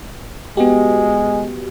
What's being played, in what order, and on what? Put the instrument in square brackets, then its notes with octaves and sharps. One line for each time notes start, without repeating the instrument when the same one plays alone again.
[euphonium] G#3 [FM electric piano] B3 F#4 G4